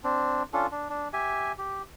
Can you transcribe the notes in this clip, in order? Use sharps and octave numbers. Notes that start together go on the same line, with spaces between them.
C4 D4
C#4 D4 F4 A4
D4
D4
G4 E5 G#5
G4